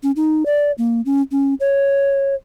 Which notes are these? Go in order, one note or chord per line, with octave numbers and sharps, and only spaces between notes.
C#4
D#4
D5
A#3
C#4
C#4
C#5